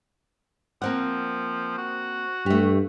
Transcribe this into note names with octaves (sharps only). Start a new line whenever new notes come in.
F3 A#3 C4 F#5
F#4
G2 A3 G4